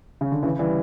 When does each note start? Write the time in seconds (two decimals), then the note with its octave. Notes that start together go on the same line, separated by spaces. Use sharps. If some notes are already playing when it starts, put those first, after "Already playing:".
0.21 C#3
0.32 D3
0.43 C#3 E3
0.59 E3 G3